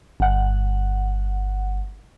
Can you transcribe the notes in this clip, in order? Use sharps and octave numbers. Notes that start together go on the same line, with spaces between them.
G1 F#5